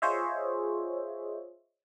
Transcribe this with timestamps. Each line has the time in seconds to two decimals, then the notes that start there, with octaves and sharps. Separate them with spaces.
0.02 F4 G#4 C5 C#5 D#5 E5